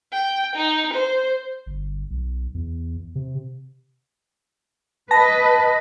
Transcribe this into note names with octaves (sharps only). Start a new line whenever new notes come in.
G5
D#4
C5
G1
B1
E2
C3
B4 D#5 A5 A#6